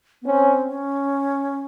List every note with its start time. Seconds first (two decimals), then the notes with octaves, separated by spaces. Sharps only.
0.22 B3
0.26 C4 C#4
0.68 C#4